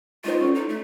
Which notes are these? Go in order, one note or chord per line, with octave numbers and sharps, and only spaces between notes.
G#3 D#4 F4 C5
C#4 A4 D5
D#4
A3